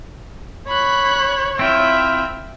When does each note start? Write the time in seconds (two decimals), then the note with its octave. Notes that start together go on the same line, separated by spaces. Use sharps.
0.68 C#5 B5 F#6
1.59 C4 E4 F4 E5 G5